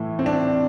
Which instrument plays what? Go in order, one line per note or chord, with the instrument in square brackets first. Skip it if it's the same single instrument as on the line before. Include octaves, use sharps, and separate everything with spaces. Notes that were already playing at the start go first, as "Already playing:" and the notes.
Already playing: [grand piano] A2 E3 A3 E4
[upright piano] C4
D4